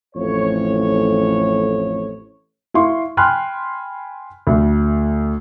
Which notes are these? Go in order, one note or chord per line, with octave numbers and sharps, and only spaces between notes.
A1 F2 C#5
E4 F5 C6 C#6
G5 G#5 B5 C6 F6 F#6
D2